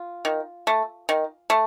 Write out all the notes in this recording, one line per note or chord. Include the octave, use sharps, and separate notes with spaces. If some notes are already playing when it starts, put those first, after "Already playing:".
Already playing: F4
D#3
A3
D#3
A3